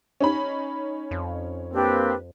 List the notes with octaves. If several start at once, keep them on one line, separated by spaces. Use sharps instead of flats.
C#4 D#4 B5
F2
A#3 C4 D4 G4 B4